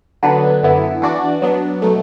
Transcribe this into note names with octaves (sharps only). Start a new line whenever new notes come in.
D3 F#3 B3 D4 B4
F#2 D3 B3 E4
E3 D4 F#4 D5
F#3 B3 D4
B2 F#3 A3